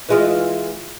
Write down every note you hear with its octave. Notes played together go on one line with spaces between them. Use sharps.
E3 G#3 F4